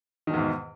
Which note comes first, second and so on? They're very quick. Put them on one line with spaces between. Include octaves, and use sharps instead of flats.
D#3 B2 E2 G#2